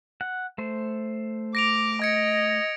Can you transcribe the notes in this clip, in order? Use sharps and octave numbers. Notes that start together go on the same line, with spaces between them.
F#5
A3 C5
D6 A#6 D7 F7
D#5 G#6 C#7